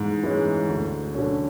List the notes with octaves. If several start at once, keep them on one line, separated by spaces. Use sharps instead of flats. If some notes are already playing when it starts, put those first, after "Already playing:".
Already playing: G#2 E3 G#3
E3 G#3 C#4
D2
D3 F#3 A3 C#4